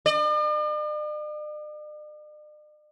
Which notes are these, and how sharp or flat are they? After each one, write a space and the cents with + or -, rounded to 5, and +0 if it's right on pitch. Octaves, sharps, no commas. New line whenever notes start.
D5 +45